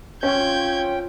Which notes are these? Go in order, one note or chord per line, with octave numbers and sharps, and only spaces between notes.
F3 C4 C#4 C#5 G5 G6 G#6